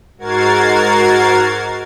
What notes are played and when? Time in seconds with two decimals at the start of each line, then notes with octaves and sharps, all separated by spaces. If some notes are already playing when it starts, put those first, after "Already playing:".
0.18 G#2 F#4 A#4 G#6 A6 C7